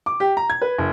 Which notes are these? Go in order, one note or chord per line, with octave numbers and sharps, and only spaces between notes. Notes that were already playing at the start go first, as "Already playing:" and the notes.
D6
G4
A#5
G#6
B4
F#1